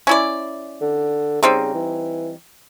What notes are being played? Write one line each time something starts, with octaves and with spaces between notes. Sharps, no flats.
C#4 E4 D5
D3
C#3 G3 C4 D#4
E3